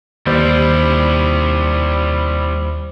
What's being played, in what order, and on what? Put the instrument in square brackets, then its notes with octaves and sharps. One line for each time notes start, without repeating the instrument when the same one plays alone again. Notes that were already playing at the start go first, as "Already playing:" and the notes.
[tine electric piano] D#2 C5 D5 [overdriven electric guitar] G3 E4